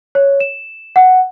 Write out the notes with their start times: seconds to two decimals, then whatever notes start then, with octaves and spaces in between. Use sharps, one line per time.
0.15 C#5
0.40 E7
0.96 F#5